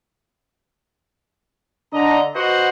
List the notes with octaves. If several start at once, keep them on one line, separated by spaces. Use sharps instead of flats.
D3 D4 D#5 A#5
F#4 B4 C5 D#5 F#5